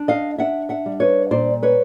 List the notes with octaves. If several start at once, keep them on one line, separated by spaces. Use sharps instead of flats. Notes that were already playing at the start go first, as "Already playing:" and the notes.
Already playing: D4
D#5 F5
D4 E5 F#5
E5 F#5
G3
B4 C#5
A#2 C5 D5
B4 C#5